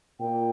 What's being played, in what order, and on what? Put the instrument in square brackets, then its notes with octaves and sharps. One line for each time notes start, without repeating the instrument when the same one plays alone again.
[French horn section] A#2 [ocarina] G5